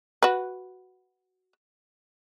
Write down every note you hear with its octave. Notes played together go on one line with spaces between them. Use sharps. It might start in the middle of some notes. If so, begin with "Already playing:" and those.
F#4 B4